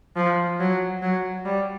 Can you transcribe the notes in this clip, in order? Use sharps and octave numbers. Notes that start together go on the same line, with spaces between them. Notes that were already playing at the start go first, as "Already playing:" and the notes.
F3
F#3
F#3
G3